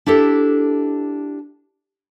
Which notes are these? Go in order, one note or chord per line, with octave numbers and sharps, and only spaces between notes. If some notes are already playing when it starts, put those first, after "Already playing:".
D4 E4 G4 A4